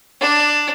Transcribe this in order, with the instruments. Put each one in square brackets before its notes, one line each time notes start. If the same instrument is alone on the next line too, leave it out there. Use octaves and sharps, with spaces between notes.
[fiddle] D4